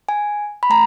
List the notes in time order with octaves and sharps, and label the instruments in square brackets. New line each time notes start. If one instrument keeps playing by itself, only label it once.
[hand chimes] G#5
B5
A3 A#5